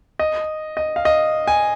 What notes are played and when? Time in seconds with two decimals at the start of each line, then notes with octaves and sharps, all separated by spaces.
0.19 D#5
0.77 D#5
0.96 F5
1.05 D#5
1.48 G#5